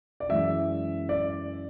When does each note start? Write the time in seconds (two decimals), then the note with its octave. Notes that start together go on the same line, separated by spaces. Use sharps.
0.20 D5
0.29 F#2 E3 G#3 E5
1.09 D5